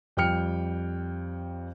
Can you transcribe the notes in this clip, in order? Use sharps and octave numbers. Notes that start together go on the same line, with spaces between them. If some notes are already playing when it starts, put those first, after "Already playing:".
F2 G3 G5 F6 C#7